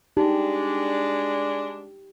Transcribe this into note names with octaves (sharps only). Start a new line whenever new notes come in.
G#3 D4 D#4 G4